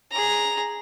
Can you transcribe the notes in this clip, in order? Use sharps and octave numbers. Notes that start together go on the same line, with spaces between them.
G#4 A#5